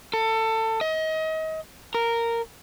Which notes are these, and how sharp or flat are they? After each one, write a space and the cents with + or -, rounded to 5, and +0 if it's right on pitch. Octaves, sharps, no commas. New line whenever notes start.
A4 +25
D#5 +30
A#4 -10